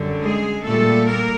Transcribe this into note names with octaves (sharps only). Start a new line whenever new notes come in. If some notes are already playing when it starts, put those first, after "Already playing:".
Already playing: F#2 D3 G3
G#3 G#4
A#2 G3 A3 A4
A#3 A#4